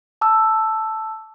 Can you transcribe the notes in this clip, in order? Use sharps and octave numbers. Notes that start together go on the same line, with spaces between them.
A5 D6 E6